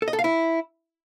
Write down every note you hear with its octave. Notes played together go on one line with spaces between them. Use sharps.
A4
D#5
A4
F5
E4